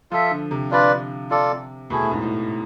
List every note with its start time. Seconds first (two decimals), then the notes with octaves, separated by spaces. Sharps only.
0.11 F3 F4 A4 E5
0.31 D3
0.51 C3
0.71 D4 F4 B4 D5
1.30 F4 A4 D5
1.90 B2 A3 E4 G#4
2.02 A2
2.11 G#2
2.22 A2